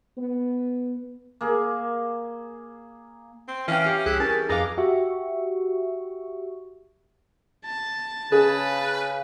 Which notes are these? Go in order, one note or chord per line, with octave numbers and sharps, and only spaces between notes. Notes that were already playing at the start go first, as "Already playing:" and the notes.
B3
A#3 G#4
C4
E3 C#4 E5 F5 G5
G4 C7
C2 E4 G#4 F#6
E3 C#4 G#4 A#4 A5
F2 D#4 G#4 B4 F5 A#5 D6
F#4 G4 E5 C#6
A5
C#3 G#4 B4